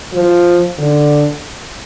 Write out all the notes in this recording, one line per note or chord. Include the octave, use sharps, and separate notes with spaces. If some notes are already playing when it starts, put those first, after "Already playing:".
F3
D3